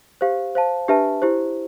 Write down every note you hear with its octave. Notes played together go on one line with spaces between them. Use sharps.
G4 C5 F5
C5 F5 A5
D4 G4 B4 E5 A5
E4 G4 C5